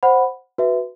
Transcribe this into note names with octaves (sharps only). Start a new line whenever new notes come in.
C5 F#5 B5
F#4 B4 E5